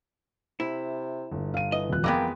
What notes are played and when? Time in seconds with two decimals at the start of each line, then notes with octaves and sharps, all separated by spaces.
0.60 C3 E4
1.31 G1 G2
1.54 F5 D#7
1.72 E3 D#5
1.89 D#1 F2 F#6
2.04 E3 G#3 A#3 B3 G5 D6